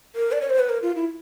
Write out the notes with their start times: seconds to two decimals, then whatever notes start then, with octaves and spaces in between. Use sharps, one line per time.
0.15 A#4
0.32 D5
0.41 C#5
0.50 C5
0.59 B4
0.69 A#4
0.82 F4
0.96 E4